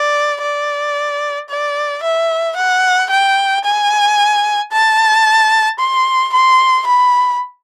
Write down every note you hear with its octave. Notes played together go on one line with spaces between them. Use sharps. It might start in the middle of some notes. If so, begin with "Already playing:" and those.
Already playing: D5
D5
D5
E5
F#5
G5
G#5
A5
C6
C6
B5